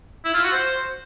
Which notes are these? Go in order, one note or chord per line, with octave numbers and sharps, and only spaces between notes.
E4
F4
F#4
C5